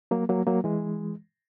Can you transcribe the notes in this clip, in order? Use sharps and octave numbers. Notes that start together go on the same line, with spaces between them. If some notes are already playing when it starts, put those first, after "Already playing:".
F#3 A#3
F#3 A#3
F#3 A#3
E3 G#3